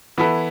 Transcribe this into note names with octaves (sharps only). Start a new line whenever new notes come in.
E3 B3 E4 A4